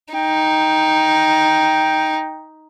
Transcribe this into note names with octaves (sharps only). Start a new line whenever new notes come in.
D#4 G5